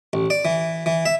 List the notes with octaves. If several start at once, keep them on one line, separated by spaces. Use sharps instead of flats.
A1
D5
E3
E3
E5